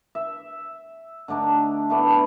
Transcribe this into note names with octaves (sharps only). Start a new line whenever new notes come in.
E5
D3 A3 D4 D#4
A3 B3 D4 E4